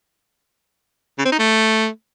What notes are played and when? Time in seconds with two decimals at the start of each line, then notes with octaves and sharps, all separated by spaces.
1.18 C#3
1.25 C4
1.32 D#4
1.39 A3